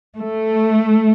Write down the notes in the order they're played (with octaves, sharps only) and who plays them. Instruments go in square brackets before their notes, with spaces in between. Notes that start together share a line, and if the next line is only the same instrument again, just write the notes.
[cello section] A3